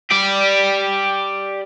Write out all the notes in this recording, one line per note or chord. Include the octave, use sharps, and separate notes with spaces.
G4 D5